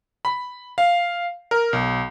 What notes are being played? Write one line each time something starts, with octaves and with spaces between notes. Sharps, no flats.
B5
F5
A#4
B1